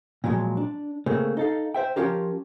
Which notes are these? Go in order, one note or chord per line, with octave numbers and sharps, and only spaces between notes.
A#2 F3 F#3 G#3
D4
C#3 A3 A#3 C4 G#4
D#4 A4 F5
C5 E5 G5
F3 G#3 C#4 F4 G4 A#4